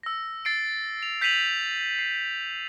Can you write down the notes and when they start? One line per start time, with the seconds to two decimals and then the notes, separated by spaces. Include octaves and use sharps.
0.03 E6 A#6
0.45 A6 C7 D7
1.03 F7
1.21 G6 B6 C7 D#7 F7 F#7
1.99 C7